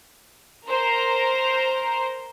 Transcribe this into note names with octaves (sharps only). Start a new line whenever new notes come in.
A#4 C5 A#5